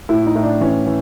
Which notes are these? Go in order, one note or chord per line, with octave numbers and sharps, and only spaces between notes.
A2 E4
D#4
A2
D4
E3 C#4
E3